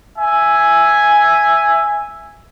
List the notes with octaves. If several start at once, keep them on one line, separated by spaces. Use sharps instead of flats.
E5 G#5